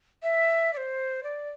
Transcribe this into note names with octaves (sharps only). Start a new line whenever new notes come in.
E5
D5
C5
D5